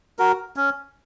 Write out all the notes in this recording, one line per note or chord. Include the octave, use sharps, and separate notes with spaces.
F#4 A#4
C#4